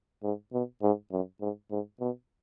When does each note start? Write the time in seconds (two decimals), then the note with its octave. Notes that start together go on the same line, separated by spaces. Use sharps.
0.23 G#2
0.53 B2
0.82 G#2
1.11 F#2
1.41 G#2
1.71 G#2
2.00 B2